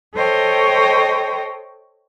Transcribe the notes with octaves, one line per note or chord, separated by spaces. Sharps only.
A4 C5 C#5 D#5 G5